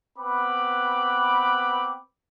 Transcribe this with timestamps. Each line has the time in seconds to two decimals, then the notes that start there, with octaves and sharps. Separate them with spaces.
0.17 B3 C4 B4 B5 D6